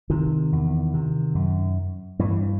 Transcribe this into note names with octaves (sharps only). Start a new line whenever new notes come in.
C3 D#3
E2
C3
F#2
G2 E3